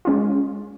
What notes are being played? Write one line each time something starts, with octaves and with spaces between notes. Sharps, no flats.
G#3 C#4 F4